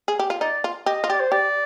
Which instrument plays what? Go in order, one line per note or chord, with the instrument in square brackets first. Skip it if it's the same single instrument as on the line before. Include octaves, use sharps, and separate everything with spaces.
[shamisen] G#4
G4
F4
[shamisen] D#4 [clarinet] D5
[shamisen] F4
[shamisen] G4 [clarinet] D#5
[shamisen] F4
[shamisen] G4 [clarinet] D5
[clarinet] C5
[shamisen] G4 [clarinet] D5